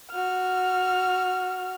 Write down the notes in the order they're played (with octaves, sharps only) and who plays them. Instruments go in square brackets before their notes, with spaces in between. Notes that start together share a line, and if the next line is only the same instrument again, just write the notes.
[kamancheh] F#4 F6